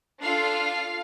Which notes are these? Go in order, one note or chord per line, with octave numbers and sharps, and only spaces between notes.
D4 F4 A4 F5